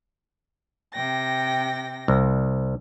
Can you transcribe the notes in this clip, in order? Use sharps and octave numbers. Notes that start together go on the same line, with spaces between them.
C3 G5 A#6
C2